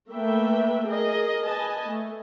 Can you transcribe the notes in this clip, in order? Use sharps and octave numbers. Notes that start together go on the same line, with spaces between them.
A3 A#3 B4 E5 G5
G#4 A#4 D#5
B4 D#5 G#5 A5
A3